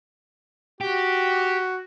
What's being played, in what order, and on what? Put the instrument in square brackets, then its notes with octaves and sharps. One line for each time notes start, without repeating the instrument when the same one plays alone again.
[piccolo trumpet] F#4 [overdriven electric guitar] G4